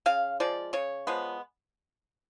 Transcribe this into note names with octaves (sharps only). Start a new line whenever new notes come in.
C#3 F5
F3 G#3 D5
C#3 C#5
F3 G#3 B3